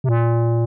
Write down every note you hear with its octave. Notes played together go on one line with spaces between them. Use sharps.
C3
A#2